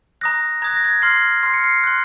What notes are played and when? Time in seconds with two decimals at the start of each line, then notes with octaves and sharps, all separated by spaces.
0.21 A#5 D#6 F#6 A#6
0.62 A#5 D#6 F#6 G#6
0.73 A#6
0.84 G#6
1.02 C6 F6 C7
1.43 C6 F6 C7
1.54 C#7
1.64 C7
1.84 C6 F#6